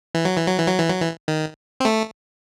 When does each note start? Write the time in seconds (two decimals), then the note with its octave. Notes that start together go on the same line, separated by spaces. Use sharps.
0.15 E3
0.25 F#3
0.36 E3
0.47 F#3
0.58 E3
0.68 F#3
0.79 E3
0.90 F#3
1.01 E3
1.28 D#3
1.80 C4
1.85 A3